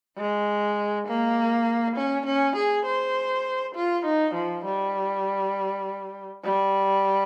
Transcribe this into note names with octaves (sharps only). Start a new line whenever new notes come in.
G#3
A#3
C#4
C#4
G#4
C5
F4
D#4
F3
G3
G3